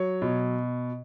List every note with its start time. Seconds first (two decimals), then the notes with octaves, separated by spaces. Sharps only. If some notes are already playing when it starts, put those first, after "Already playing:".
Already playing: F#3 C#5
0.22 B2